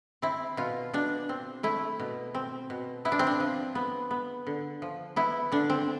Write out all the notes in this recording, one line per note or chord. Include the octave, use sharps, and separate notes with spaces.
C4 E4
B2 F4
B2 D4
C4
A3 E4
B2
C4
B2
B3 E4
D4
C4
D4
F3
B3
B3
D3
F3
B3 E4
D3 D4
C4